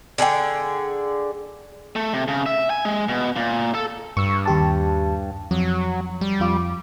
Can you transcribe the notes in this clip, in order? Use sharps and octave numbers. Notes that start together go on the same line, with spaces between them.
D3 G#4 D5 G5
A3
C3
C#3
E5
G#5
G#3
B2
A#2
A4
G2 C#6 E6
D#2 G4 A5
F2 F#3
G3
F2 F4 D6